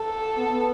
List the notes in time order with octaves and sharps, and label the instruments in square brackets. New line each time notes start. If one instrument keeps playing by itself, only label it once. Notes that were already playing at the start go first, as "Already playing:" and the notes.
Already playing: [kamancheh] A4
[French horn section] B3